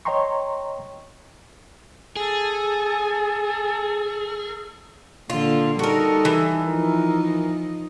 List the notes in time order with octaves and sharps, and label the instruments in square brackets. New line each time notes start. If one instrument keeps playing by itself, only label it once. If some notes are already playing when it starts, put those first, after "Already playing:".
[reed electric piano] C#5 D#5 G5 A#5 C6 C#6
[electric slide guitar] G#4 [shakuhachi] A4 [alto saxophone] G#5
[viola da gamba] A#2 D3 [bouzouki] F4
[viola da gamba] G3 D#4 [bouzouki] F#4 A#4 [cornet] A4
[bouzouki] E3
[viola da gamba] F3 D#4 [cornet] A#4